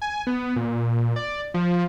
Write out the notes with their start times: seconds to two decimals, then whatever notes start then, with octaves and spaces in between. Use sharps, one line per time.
0.02 G#5
0.27 B3
0.56 A#2
1.16 D5
1.54 F3